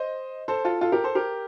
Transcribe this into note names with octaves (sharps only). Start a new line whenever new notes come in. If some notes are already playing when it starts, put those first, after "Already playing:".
Already playing: C5 D#5
A4 C5
F4 A4
F4 A4
G4 A#4
A4 C5
G4 A#4